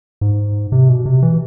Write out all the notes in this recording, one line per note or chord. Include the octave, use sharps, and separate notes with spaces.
G#2
C3
B2
C3
E3